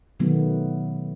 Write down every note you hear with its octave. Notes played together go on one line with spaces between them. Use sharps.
B2 D#3 F#3 A3 B3